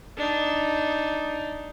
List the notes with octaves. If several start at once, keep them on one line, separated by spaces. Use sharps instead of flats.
D4 D#4